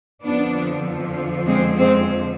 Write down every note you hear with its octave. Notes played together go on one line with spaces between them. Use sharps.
F2 D3 F3 B3 D4
G#3 C4
G#3 C4